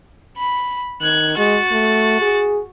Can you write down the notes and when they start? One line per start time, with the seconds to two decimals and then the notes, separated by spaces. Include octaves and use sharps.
0.38 B5
1.01 D#3 F#6 G#6
1.38 G#3 F#4 A6
1.72 A3
2.22 G#4